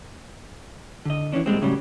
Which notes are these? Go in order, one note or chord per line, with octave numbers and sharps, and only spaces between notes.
D3 D#5
E3 G3 C#4 D4
A#2 G3 G#3 C4
A2 C#3 F#3 G3